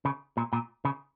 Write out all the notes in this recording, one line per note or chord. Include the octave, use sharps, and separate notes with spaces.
C#3
A#2
A#2
C#3